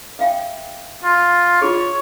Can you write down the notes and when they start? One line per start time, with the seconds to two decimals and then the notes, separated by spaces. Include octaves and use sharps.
0.19 E5 F5 G5
1.04 F4
1.62 F4 G#4 C#5